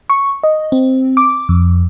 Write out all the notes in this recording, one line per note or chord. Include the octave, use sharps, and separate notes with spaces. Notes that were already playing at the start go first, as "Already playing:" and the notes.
C#6
D#5
C4
D6
F2